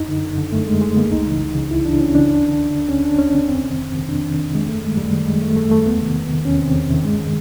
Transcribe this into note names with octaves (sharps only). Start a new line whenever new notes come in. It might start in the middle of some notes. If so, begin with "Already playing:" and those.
Already playing: F#2 D#4
D3
F#2
D3
F#2 A3
D3 G#3
F#2 G#3
D3 A#3
C#2 D#4
C#3 E3
C#2
C#3 E3
C#2 E4
C#3 E3 D4
C#2 C#4
C#3 E3 D4
D2
D3
D2
D3
D2 C#4
D3 D4
D2 C#4
D3 C4
F2 C4
C3 D#3
F2
C3 D#3
F2 D4
C3 D#3
F2
C3 D#3 G#3
F#2 A3
D#3 G#3
F#2 G3
D#3
F#2 G#3
D#3 A3
F#2 A3
D#3 A3
E2 B3
C3 D#3
E2
C3 D#3
E2 C#4
C3 D#3 C4
E2
C3 D#3
G2 G#3
D#3